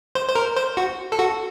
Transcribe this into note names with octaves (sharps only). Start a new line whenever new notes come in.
C5
C5
A#4
C5
F#4
A4
F#4